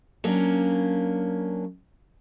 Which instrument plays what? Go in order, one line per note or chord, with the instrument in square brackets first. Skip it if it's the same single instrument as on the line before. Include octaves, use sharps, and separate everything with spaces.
[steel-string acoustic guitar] F#3 A#3 C#4 D4